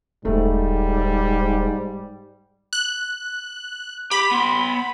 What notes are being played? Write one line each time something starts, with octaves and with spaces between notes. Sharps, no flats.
D#1 G#2 D3 G3 A3
F#6
G4 B5
B3 C6